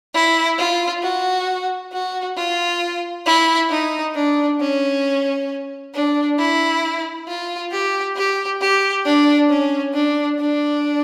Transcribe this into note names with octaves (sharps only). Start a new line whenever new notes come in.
E4
F4
F#4
F#4
F4
E4
D#4
D4
C#4
D4
E4
F4
G4
G4
G4
D4
C#4
D4
D4